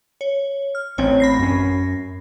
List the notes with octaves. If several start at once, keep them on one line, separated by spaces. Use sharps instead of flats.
C#5
F6
A1 C4 C#5
B5 A#6 C7
F#2 C#4